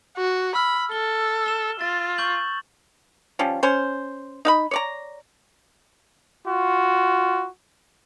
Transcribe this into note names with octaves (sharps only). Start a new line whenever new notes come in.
F#4
B5 E6 F6
A4 G7
E7 G7
F4 A6
C#6 G6 F#7
F3 G3 C#4
C#4 C5
D#4 F5 B5
C#5 D5 A#5
F4 F#4